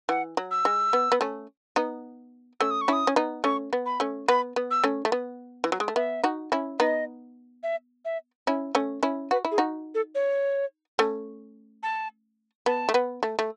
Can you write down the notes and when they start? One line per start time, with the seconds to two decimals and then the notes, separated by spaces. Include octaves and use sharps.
0.09 E3 F#5
0.37 F#3
0.51 E6
0.65 G#3
0.93 B3
1.12 B3
1.21 A3 C#4
1.76 B3 D#4
2.60 A3 C#4 E6
2.71 D#6
2.81 C#6
2.88 C#4 E4 D#6
3.07 C#4
3.16 B3 D#4
3.44 A3 C#4 C#6
3.73 B3
3.86 B5
4.00 A3 C#4
4.28 B3 B5
4.56 B3
4.71 E6
4.84 A3 C#4
5.05 A3
5.12 B3
5.64 E3
5.72 F#3
5.80 G#3
5.88 A3
5.96 B3 E5
6.24 D#4 F#4
6.52 C#4 E4
6.79 B3 D#4 D#5
7.63 E5
8.05 E5
8.47 C#4 E4
8.75 A3 C#4
9.03 C#4 E4
9.31 F#4 B4
9.45 E4
9.51 G#4
9.58 D#4 F#4
9.94 A4
10.15 C#5
10.99 A3 C#4
11.83 A5
12.66 B3 A5
12.89 A3
12.94 B3
13.23 A3
13.39 A3